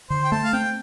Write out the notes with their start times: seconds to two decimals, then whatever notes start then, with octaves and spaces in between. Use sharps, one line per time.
0.10 D3 C5
0.24 G5
0.32 A3 A5
0.45 F5
0.53 C4 G5